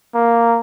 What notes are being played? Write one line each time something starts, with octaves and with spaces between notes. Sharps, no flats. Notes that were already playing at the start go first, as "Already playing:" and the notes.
A#3